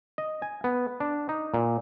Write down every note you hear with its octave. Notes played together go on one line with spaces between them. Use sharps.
D#5
G#5
B3
D4
D#4
A#2